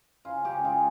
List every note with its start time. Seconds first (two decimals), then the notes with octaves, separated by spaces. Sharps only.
0.25 C#3 F4
0.45 C#3 G4
0.64 G#3 F4